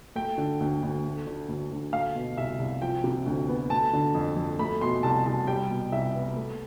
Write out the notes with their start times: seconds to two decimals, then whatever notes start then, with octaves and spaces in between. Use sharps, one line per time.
0.15 A3 G5
0.38 D3
0.60 D2
0.83 D2
1.04 A3
1.26 D3
1.49 D2
1.71 D2
1.93 A3 F5
2.15 B2
2.37 C2 E5
2.59 C2
2.82 F3 G5
3.04 C3
3.26 D2
3.48 B3
3.70 A3 A5
3.93 D3
4.15 F2
4.37 F2
4.59 A3 B5
4.81 B2 C6
5.03 C2 A5
5.26 C2 A5
5.47 G3 G5
5.70 B2
5.92 C2 E5
6.15 B3
6.36 A3